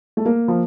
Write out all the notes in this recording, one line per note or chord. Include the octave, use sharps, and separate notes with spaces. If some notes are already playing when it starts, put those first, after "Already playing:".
A3
A#3
F3